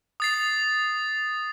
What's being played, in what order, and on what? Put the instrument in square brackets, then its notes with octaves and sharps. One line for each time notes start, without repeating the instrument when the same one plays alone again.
[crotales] D#6 A6 C7